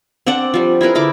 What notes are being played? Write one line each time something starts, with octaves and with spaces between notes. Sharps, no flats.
C4 D4 D5 F#5
F3 G3
E4 G#4 A#4 B4
D3 E4 D6